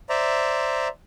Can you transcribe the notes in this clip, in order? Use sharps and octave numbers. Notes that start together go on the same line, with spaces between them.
C5 D5 E5 A#5